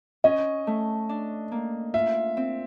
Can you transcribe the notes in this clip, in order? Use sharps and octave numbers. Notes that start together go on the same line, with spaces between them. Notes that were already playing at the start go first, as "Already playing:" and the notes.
C#4 D#5
A3
D4
A#3
F4 E5
C4